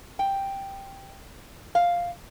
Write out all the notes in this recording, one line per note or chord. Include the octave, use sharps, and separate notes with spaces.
G5
F5